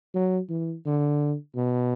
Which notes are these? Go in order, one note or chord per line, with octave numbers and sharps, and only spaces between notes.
F#3
E3
D3
B2